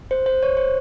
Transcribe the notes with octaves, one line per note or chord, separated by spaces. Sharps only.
C5
C5
C#5
C5